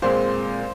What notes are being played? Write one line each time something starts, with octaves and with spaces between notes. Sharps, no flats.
A#2 G#3 C4 C5